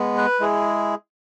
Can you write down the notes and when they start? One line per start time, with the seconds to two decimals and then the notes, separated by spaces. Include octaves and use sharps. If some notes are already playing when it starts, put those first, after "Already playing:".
Already playing: G#3 B3
0.17 B4
0.40 G#3 E4 G#4